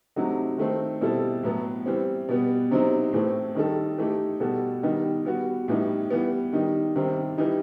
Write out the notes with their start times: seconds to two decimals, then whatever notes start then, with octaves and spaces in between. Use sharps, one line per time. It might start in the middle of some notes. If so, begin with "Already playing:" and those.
0.16 C3 F#3 A3 D#4 F#4
0.58 D#3 A3 C4
1.01 B2 G3 C4 E4 A4
1.43 A2 F#3 B3
1.86 E3 G3 C4
2.29 B2 G3 B3
2.71 C3 F#3 C4 D#4
3.13 A2 E3 A3 C4
3.55 D#3 G3 D#4 A4
3.98 E3 A3 D#4 G4
4.40 B2 G3 B3 F#4 A4
4.83 D#3 G3 B3 D#4
5.25 G3 B3 F#4
5.68 A2 E3 G3 D#4
6.10 E3 G3 B3
6.53 D#3 G3 D#4
6.96 C3 D#3 G3 C4
7.38 E3 G3 D#4